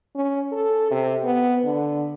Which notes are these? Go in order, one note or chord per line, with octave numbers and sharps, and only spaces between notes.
C#4
A4
C3
B3
D3